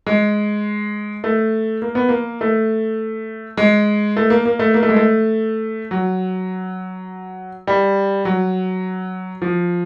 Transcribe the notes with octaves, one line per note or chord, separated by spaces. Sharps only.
G#3
A3
A#3
B3
A#3
A3
G#3
A3
A#3
A#3
A3
A#3
A3
G#3
A3
F#3
G3
F#3
F3